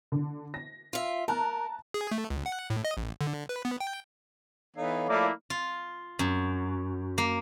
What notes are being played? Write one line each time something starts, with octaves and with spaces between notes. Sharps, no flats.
D3
A#6
F4 E5
A#4 A5 A#5 F#6
G#4
A3
C#2
F#5
A2
D#5
A1
D3
B4
B3
G5
E3 B3 D#4 A4 C#5 F5
F3 A3 A#3 E4 D5
F4
F#2
A#3